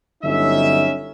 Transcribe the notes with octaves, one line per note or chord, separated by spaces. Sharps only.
G1 D3 F#3 C#4 D#4 E5